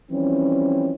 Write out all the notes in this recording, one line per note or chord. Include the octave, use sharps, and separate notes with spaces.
E3 F3 G3 C4 C#4